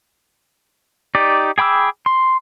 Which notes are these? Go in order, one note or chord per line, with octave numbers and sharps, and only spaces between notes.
D#4 G4 D5
G#4 G5 B5 D6 E6
C6